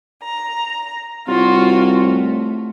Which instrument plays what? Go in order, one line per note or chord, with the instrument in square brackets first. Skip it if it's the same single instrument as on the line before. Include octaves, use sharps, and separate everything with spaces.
[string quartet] A#5
[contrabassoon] C2 [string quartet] F4 F#4 C#5
[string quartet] A3